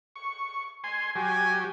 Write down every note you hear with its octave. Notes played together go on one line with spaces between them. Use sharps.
C#6
G#5 C6
F#3 G4 G#5